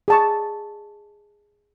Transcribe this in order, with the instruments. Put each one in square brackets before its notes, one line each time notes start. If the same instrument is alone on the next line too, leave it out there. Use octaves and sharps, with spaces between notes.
[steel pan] G#4 A5 C#6